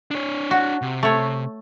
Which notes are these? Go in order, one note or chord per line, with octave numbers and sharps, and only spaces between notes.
D4 C#5
F#4
C3
A3 C#5